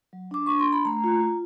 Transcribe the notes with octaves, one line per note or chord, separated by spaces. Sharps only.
F#3
D4 D6
D4 C#6
C6
D4
B5
A3 A#5
F4
F4